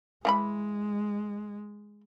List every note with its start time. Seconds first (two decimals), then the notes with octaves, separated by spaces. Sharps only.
0.25 E3 G#3 G#4 B5